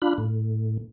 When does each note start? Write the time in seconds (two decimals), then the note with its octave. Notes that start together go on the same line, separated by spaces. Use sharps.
0.02 D4 F4 B5 F#6
0.18 A2